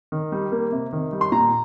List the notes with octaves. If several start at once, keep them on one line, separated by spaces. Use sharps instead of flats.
D#3
G3
A#3
C3
D#3
G3
C6
A#2 A#5